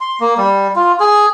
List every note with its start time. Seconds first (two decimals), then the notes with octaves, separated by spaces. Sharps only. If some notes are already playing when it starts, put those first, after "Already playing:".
0.01 C6
0.20 A#3
0.38 G3
0.76 F4
1.00 G#4